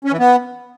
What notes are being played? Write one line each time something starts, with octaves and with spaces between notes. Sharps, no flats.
C#4
E3
B3